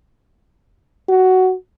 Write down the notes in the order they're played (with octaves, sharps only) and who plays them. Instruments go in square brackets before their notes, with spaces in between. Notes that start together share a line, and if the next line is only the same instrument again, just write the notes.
[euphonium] F#4